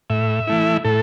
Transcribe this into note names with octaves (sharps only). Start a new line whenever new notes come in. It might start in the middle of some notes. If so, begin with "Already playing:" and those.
A2 E5
E3 A3 E4
A2 A4